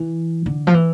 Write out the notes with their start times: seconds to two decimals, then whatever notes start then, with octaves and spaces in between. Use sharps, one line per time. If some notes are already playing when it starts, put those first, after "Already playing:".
Already playing: E3
0.46 D3
0.67 F3
0.74 E3